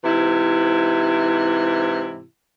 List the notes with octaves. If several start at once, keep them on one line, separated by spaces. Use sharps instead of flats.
G#2 C3 E3 E4